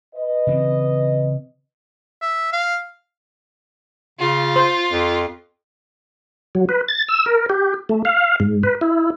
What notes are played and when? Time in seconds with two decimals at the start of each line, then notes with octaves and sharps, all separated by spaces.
0.16 B4 D#5
0.47 C#3 E3 C4
2.22 E5
2.53 F5
4.19 C#3 F4
4.56 C5
4.92 F2
6.55 F#3
6.69 B4
6.88 A6
7.08 E6
7.26 A#4
7.50 G4
7.89 A3
8.05 F5
8.40 G#2
8.63 B4
8.81 E4